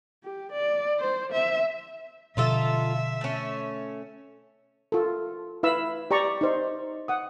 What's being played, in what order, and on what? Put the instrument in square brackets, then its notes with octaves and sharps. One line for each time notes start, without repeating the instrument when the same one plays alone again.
[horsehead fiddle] G4
D5
C5
E5
[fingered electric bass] B2 D3 F3 [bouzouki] D#4 F4 A4 [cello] E5
[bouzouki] A3 C#4
[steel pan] F4 A4
E4 B4 F5 B5 E6
G4 D5 A#5 C#6
D#4 C5
F#5 D#6